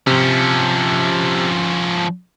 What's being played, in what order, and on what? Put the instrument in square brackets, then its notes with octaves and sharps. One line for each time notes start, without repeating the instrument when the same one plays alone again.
[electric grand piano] C3 [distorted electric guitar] F3 C#4